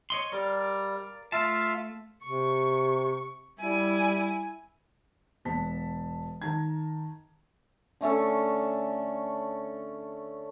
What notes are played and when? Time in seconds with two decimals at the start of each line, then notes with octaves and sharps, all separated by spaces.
0.10 C#5 D#5 C6
0.32 G3 A#4 D5 F5
1.32 A3 F4 E5 F5 A5
2.23 C3 C#6
3.59 G3 E4 G#5
5.45 E1 B3 A5 B6
6.42 D#3 A5 A#5 G#6
8.01 D3 A3 C#4 A4